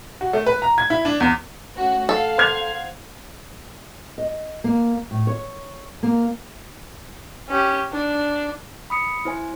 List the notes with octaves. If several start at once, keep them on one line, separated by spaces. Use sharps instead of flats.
F#4
A3
B4
A#5
G#6
E4
D4
E2
A3 C#4 F#4
A4 F5 F#5
C5 G#6 F7
D#5
A#3
A2
C#5
A#3
C#4 G4
D4
B5 D#6 C#7
E4 C5 G#5